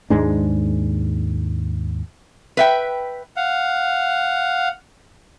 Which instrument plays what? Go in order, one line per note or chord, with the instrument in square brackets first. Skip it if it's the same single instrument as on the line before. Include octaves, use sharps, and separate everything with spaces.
[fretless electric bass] D#2 G#2 G#3 D4
[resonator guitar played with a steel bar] B4 E5 G5
[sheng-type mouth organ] F5 F#5